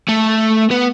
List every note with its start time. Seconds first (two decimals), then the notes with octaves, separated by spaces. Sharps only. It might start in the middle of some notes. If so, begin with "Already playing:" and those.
0.09 A3
0.71 B3